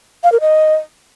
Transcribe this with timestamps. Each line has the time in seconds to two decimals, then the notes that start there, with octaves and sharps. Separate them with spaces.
0.24 F5
0.32 A#4
0.41 D#5